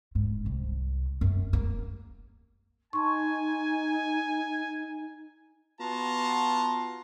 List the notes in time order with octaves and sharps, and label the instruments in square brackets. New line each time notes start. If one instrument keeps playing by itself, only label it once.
[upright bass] G#2
C2
F#2
A#3
[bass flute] D#4 [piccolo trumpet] G#5 [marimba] A5 C6 C#6
[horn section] B3 F4 F#4 A5 A#5 C6